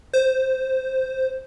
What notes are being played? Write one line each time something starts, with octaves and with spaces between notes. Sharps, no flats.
C5